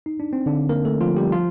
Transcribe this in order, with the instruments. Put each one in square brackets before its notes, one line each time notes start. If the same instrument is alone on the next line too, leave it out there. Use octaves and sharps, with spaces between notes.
[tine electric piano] D#4
D4
C4
D3 D4
A#3 A#4
A3 A4
F3 F4
G3 G4
F3 F4